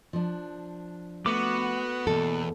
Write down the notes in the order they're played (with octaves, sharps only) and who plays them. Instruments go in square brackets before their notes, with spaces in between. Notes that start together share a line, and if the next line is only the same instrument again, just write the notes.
[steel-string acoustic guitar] F3 D4
[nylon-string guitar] A3 [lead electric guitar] B3 [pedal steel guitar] F#4 D6
[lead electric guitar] E2 [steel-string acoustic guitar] B2 A#3 [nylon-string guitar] A4